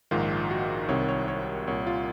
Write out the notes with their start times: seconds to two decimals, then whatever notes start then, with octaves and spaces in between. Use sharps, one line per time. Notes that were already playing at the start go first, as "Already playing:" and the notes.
0.11 A#1 G#2 D#3 F4
0.51 F#4
0.88 C2 C3 D#3 C#5
1.09 C#5
1.28 C#5
1.67 C2 A#2 C#5
1.87 F4